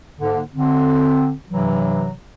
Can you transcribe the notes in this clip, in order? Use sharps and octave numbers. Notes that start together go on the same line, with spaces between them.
G#2 D3 A#3
D3 C4
G2 C3 E3 F#3